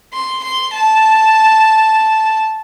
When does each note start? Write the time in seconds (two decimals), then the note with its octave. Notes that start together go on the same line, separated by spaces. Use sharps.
0.13 C6
0.43 C6
0.73 A5